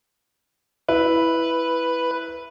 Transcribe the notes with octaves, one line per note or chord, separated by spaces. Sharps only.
E4 B4